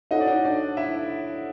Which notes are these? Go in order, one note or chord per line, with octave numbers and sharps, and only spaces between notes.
C#4 D#4 F#4 A4 C5 D#5
D5
D#4 D#5
D4 D5
E4 E5